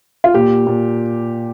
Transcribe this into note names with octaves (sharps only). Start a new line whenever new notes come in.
F4
A#2 G4
A#2